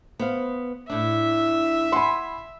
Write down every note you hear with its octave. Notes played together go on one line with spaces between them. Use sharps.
B3 C5 F5
A2 D4 E5
F#5 G#5 B5 C6